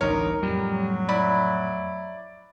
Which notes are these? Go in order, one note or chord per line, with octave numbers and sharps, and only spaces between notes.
A1 D2 G2 D#4 A#4 C#5
F2 A2 F#3 G3
E4 D5 B5